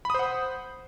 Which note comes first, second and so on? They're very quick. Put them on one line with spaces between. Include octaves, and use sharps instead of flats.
B5 D#6 C5 F#5